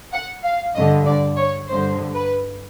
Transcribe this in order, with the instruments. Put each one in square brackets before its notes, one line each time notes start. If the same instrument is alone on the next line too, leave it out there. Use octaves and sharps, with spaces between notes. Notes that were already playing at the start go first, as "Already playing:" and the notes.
[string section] F#5
F5
G2 D3 D#5
D5
C#5
G2 D3 C5
B4